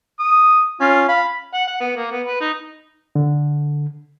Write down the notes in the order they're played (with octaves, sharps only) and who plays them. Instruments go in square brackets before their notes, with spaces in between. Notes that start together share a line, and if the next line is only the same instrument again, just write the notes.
[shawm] D#6
[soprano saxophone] C#4 [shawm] F4
[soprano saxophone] F5 [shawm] B5
[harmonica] F#5
F#5
B3
A#3
B3
B4
D#4
[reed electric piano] D3